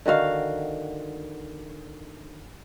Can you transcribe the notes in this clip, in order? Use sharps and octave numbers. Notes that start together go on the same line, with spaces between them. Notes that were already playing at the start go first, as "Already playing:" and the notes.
D3 D#3 F#4 F5